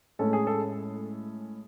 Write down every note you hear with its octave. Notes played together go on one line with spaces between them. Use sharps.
A2 G#3 C#4 A4
G#4
A4